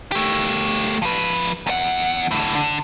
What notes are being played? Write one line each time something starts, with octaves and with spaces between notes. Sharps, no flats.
A3 G4
F3 B4
E2 F#5
A2 D3
D3